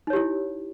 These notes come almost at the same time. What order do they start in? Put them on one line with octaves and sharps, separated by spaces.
D#4 C#5 G4 E4